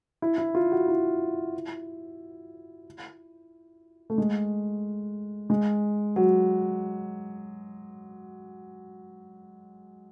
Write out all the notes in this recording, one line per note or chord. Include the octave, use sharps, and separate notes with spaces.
E4
E4
F4
F#4
E4
A3
G#3
G#3
F#3